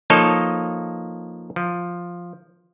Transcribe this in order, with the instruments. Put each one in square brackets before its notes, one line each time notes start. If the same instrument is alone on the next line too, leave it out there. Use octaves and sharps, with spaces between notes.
[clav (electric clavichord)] F3 A#3 D#4 A4 C#5 D#5
F3